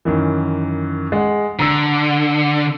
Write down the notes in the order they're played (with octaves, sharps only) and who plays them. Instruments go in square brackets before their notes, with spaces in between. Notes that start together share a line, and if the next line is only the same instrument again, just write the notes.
[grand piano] F#2 D#3 E3
G#3 F#5
[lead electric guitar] D3 [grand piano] A#5 E6